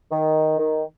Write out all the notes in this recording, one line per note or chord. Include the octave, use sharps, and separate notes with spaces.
D#3
D#3